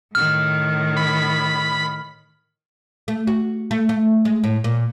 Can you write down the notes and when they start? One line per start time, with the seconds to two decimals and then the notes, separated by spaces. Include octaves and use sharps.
0.15 A2 D#3 F6
0.97 B5
3.08 A3
3.27 F#4
3.71 A3
3.89 A3
4.25 G#3
4.44 A2
4.64 A#2